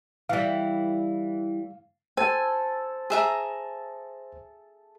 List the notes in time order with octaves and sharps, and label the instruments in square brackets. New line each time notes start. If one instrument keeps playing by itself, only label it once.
[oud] E3 G3 [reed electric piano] F5
[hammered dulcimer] A4 [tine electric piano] C5 [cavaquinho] G#5
[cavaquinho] G#4 E5 A#5